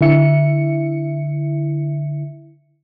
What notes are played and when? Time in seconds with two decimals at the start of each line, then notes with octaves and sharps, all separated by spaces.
0.01 D3 E4 E5 C#7